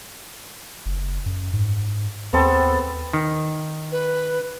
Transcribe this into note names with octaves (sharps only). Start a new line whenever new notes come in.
F#1
F#2
G#2
D#2 B3 C4 A4
D#3
B4